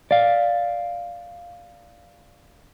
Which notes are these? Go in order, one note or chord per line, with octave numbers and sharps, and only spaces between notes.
D5 F5